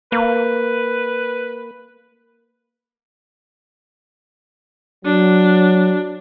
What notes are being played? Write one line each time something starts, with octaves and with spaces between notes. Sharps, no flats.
A#3 B4
F#3 D4